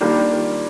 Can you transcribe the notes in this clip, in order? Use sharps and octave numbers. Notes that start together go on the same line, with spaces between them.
D#3 G3 A#3 D4 F4